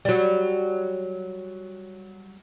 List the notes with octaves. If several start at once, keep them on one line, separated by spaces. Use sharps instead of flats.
F#3 G3